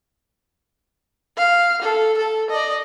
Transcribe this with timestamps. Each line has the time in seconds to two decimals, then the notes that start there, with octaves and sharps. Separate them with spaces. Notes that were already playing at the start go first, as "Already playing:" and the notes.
1.37 F5
1.82 A4
2.18 A4
2.50 D5 D#5